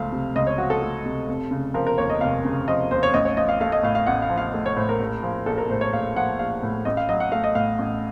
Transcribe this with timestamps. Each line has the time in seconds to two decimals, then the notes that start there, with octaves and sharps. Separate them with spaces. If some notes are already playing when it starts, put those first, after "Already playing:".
Already playing: C#2 F3 A3 F5
0.12 C3
0.35 C#2 D#5
0.47 C#5
0.58 F3 F#4
0.70 A4
0.82 A3
1.05 C3
1.28 F1
1.51 C#3
1.74 F3 A#4
1.87 A#4
1.98 D#2 C#5
2.10 D#5
2.21 F1 F5
2.45 C#3
2.68 F3 D#5
2.91 D#2 C5
3.03 C#5
3.14 A1 D#5
3.25 C#5
3.37 F3 D#5
3.49 F5
3.60 A3 F5
3.72 D#5
3.83 A2 F5
3.95 F5
4.06 A1 F#5
4.22 F5
4.30 F3
4.37 F5
4.54 A3
4.66 C#5
4.76 A2 C5
4.89 A#4
5.00 A#1
5.23 F3
5.46 A#1 A4
5.58 A#4
5.70 A2 C5
5.81 C#5
5.93 A#1 F5
6.16 F3 F#5
6.39 A#1 F5
6.63 A2
6.85 A1 D#5
6.97 F5
7.09 F#3 D#5
7.20 F#5
7.32 A3 F5
7.44 D#5
7.55 A2 F5
7.79 A1